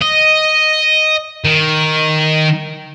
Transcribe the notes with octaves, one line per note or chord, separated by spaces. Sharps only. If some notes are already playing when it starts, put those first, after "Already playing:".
D#5
D#3